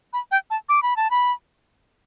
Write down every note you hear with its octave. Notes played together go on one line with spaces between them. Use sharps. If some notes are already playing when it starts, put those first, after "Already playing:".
B5
G5
A5
D6
B5
A5
B5